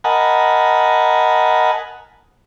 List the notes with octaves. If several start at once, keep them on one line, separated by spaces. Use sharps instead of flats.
A#4 D#5 F#5 G#5 A5 B5